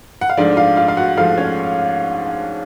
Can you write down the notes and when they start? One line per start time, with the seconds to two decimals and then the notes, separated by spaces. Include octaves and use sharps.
0.21 F#5
0.29 F5
0.37 G#2 F3 A3 D4 D5
0.57 F4 F5
0.77 F4 F5
0.88 F5
0.97 F#4 F#5
1.17 G#2 F3 A3 F4 F5
1.37 C#4 C#5